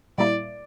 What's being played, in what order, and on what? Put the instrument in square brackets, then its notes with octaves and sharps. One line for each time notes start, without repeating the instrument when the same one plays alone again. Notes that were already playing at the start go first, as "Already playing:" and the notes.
[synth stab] A#2 G3 A#3 E4 [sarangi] D5